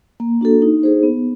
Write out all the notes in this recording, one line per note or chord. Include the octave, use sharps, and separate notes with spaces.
A#3
D4 F#4 A4
D#4
G#4 C5
B3